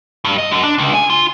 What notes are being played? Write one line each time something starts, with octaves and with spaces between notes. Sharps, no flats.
G2
D#5
F#2
D4
C#2
G#5
F4